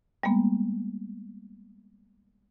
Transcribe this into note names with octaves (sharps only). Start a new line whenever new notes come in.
G3 G#3 A#3 B3